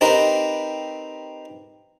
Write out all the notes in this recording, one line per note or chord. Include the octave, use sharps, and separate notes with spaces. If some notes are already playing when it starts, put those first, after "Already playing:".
C4 D#4 G4 A#4 B4